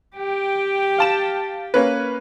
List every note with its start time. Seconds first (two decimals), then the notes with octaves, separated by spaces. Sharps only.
0.17 G4 G5
0.98 F5 A5 E7
1.74 A#3 C#4 B4